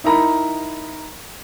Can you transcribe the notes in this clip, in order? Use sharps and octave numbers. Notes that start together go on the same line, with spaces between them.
D#4 E4 A#4 A#5 B5